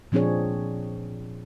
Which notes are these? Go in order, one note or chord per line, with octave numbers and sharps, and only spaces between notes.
A#2 F3 C4 D4 G#4 C#5